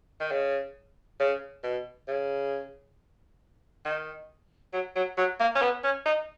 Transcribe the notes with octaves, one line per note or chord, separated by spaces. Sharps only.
D#3
C#3
C#3
B2
C#3
D#3
F#3
F#3
F#3
A#3
C#4
B3
C#4
D#4